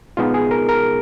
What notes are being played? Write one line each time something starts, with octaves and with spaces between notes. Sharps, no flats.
B2 G#3 B3 D#4 F4
G#4
A#4
A#4